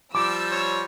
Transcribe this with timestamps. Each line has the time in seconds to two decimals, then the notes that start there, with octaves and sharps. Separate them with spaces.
0.15 F3 G3 D6 E6
0.51 C#5